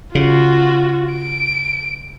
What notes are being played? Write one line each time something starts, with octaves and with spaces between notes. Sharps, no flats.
C#3 F4 F#4
D7